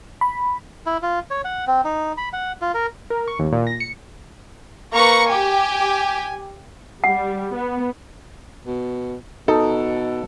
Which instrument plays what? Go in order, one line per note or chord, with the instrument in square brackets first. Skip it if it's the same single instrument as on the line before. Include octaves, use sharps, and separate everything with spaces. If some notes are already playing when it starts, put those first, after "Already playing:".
[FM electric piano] B5
[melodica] E4
F4
C#5
F#5
C4
D#4
B5
F#5
F4
A#4
[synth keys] A#4
C#6
D#2
A#2
A#6
C#7
[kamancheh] A#3 B4 [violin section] A#5 C#6 C#7
[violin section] G4 [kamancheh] G#5
[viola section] G3 [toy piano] F#5
[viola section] B3
[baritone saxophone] B2
[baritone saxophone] B2 [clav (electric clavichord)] D#4 [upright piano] A4